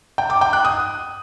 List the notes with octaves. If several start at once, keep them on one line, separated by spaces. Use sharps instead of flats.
G5
D6
G5
F#6
D#6